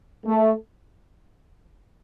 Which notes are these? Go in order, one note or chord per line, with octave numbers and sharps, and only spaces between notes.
A3